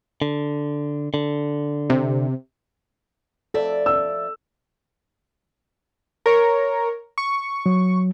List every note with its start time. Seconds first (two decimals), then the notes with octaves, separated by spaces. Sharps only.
0.22 D3
1.14 D3
1.90 C3
3.54 F2 A4 D5 E5
3.86 E6
6.26 A#4 C#5
7.18 C#6
7.66 F#3